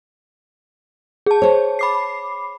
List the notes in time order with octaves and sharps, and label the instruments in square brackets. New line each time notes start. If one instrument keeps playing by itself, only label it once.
[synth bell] G#4 A5
[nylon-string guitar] C5 C#5
[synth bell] B5 D6 C7